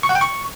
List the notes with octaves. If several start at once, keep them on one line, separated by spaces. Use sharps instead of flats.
C#6
F#5
G5
C#6